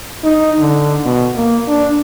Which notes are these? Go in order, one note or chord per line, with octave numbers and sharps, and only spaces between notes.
D#4
D3
B2
A#3
D4